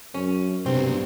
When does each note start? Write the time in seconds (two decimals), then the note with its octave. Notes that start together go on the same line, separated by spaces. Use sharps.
0.14 F#2 C#4
0.66 C2 G2 B2 C4